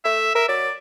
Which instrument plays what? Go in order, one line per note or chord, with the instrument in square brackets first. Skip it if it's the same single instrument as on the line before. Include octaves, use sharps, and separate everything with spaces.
[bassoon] A3 [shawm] E5
[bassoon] A#4 [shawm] E5
[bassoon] F#3 [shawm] D5